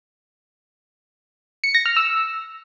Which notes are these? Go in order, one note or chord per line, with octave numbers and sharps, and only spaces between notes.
C#7
A#6
F6
E6